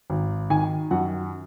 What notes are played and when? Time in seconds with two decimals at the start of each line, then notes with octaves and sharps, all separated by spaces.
0.10 G#1
0.50 D#3 G#5
0.91 F#2 F#5